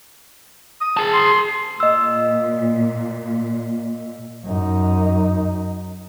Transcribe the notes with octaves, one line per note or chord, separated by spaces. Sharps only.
D#6
G#4 A5
C6
A#2 D#5 E6
F#2 D#4